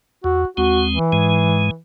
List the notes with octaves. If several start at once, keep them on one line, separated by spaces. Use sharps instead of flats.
E2 F#4
D#2 G#3 C4 F#4
E3
G#2 G#3